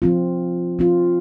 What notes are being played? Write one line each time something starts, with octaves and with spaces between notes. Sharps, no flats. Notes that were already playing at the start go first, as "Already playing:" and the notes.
F3 C4 F4
F3 C4 F4